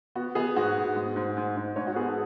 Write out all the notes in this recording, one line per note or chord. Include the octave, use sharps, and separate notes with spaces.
B3 F#4
B3 G#4
G#2 F#4
G#2
G#2
G#2
G#2
G#2
G#2 C#5
F#4
B3 G#4
A4